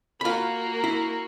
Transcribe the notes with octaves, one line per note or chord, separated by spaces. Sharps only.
A#3 F4 F#4 B5
E4